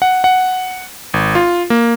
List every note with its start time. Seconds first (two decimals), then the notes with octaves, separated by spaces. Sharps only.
0.02 F#5
0.24 F#5
1.14 G#1
1.35 F4
1.70 A#3